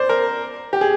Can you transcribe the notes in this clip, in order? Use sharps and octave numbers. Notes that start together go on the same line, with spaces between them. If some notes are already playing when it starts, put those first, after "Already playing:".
Already playing: C5 D5
A#4
G4
G#4